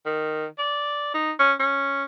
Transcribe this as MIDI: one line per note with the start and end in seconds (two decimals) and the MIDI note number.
0.06 0.46 51
0.58 1.12 74
1.14 1.32 63
1.39 1.53 61
1.60 2.04 61